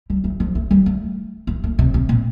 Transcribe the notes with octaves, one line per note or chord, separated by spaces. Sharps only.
G3
A3
F3
A3
G3
A3
A#3
A#3
C3
C3
A#2